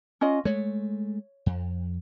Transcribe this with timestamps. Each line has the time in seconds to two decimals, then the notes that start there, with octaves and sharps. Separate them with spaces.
0.21 C#4 F4 D#5
0.45 G#3 A3 C#5
1.46 F2